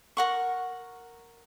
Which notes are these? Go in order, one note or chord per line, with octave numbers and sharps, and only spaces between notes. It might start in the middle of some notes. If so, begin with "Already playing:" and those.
A#4 F#5 C#6